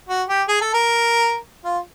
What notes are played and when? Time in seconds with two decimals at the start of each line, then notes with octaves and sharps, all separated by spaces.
0.09 F#4
0.29 G4
0.48 G#4
0.61 A4
0.74 A#4
1.65 F4